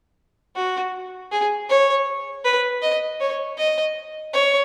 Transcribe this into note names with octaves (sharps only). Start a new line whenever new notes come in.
F#4
G#4
C#5
B4
D#5
C#5
D#5
C#5